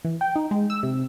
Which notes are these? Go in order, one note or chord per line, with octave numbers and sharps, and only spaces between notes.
E3
G5
D#4
G#3
E6
C3